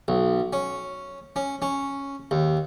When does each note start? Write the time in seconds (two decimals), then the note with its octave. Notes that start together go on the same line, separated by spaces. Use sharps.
0.08 B1
0.53 C#4
1.36 C#4
1.62 C#4
2.31 D#2